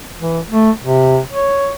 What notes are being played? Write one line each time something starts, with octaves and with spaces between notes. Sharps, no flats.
E3
A3
C3
C#5